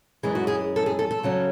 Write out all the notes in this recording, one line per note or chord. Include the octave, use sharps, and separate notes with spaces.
F#2 E3 G#3 C#4 G#4
F#4
G#4
A4
G#4
A4
A4
C#3 F#3 C#4